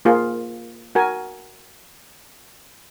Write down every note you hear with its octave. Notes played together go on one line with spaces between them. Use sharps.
A#3 F4 G#4
F#4 A#4 G#5